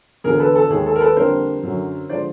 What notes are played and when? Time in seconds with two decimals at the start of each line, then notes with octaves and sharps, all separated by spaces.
0.24 E1 D2 D3 G#4 A#4
0.40 A4 B4
0.55 A4
0.70 D#2 D#3 G#3 G#4
0.86 A4
0.96 A#4
1.01 A4 B4
1.16 F2 D3 G3 A#3 D4 A#4 C5
1.63 F#2 D3 F#3
2.09 D3 F3 G#3 C5 D5